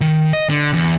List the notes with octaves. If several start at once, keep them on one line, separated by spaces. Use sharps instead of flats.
D#3
D#5
D3
E2